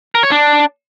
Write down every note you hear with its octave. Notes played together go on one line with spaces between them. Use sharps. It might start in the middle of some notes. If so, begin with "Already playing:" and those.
A#4
C#5
D4